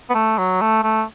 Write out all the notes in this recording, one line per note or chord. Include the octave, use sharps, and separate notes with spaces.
B3
A3
F#3
A3
A3